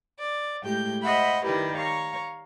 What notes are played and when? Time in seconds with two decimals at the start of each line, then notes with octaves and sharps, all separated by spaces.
0.18 D5
0.63 A2 G#3 G4 G5 G6
1.02 C5 D#5 E5 F#5 B5
1.45 D#3 G3 E4 G4 A#4 B4
1.77 C#5 F5 A#5 C#6